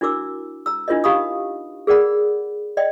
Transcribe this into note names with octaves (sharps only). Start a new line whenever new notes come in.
D4 E4 F#4 A#4 D6 E6
A#5 E6
D4 E4 F4 A#4 C#5 D#5
D#4 G4 F5 B5 C#6 D#6
G#4 A#4 D5 F#5 B5
D5 D#5 G5